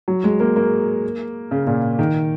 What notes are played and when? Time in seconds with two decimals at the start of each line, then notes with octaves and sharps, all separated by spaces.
0.08 F#3
0.24 G#3
0.40 A#3
0.56 A#3
1.51 C#3
1.67 A#2
1.99 D#3